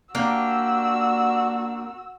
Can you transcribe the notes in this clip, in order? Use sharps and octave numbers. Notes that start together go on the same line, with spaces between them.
A#3 D4 F#4 G4 E6